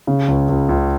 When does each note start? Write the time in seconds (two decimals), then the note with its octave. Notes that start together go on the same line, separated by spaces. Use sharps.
0.07 C#3
0.28 C#2
0.49 C#2
0.69 C#2